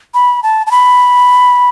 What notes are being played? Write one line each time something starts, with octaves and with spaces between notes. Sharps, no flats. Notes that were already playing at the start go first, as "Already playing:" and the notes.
B5
A5
A5
B5